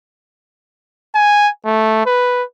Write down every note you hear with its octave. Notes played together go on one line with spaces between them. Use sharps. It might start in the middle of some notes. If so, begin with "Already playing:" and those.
G#5
A3
B4